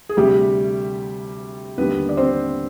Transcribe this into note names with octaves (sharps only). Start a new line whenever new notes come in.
G#4
D2 C3 G3 G4
D#2 D3 G3 B3 B4
D5
C4 C5